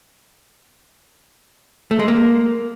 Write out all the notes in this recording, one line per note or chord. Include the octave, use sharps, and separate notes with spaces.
A3
G#3
A#3